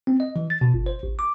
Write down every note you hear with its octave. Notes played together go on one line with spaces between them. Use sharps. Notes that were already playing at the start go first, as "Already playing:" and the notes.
C4
D#5
E3
A6
B2
G1
C5
A1
D6